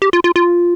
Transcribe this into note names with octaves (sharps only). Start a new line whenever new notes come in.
G4
F4
F4
F4